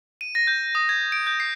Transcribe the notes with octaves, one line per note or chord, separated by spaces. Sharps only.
D#7
A#6
G6
D#6
G#6
D7
G6
C7